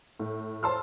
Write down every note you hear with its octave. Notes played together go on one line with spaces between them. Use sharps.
A2
C5 C#5 A5 C6 E6 F6